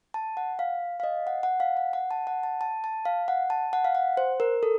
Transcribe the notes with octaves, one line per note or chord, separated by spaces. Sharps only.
A5
F#5
F5
F5
D#5
F#5
F#5
F5
F#5
F#5
A5
F#5
A5
A5
A5
F5
F#5
A5
F#5
F5
F#5
C5
A#4
A4